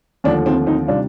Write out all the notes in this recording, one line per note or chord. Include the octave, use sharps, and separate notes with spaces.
D#2 D3 F3 A3 D4
C4 D#4
C4 D#4
C3 D#3 G3 D4 F4